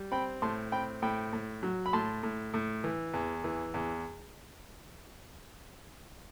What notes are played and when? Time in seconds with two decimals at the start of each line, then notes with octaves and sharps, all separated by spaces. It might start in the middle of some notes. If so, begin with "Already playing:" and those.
Already playing: G3
0.12 C4 G5 B5
0.42 A2 A5 C6
0.72 C4 G5 B5
1.02 A2 G5 B5
1.33 A2
1.63 F#3
1.86 B5
1.93 A2 A5 C6
2.23 A2
2.54 A2
2.84 E3
3.14 E2
3.44 E3
3.74 E2